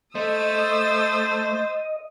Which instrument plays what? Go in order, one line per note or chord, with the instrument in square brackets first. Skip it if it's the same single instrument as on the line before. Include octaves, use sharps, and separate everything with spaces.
[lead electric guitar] A3 [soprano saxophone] C5 [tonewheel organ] D#5 [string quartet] D#6 E6 A6